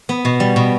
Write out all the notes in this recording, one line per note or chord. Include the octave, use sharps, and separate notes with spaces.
B3
B2
G3
B2